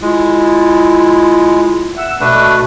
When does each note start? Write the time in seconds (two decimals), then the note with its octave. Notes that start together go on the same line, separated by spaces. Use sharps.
0.02 G#3 E4 F4
1.97 E5 F#5 E6
2.21 B2 A3 D4 B4